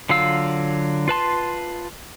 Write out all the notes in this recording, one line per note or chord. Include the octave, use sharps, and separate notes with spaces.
D3 F#3 F4 F5 E6
F4 B4 A5 C6